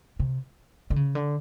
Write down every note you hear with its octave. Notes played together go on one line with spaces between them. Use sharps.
C3
D3
C#3
D3